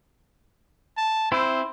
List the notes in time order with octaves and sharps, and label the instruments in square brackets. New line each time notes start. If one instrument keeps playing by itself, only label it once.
[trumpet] A5
[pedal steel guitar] C4 E4 [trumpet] C5